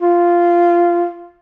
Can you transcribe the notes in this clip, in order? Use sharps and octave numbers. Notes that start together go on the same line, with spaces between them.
F4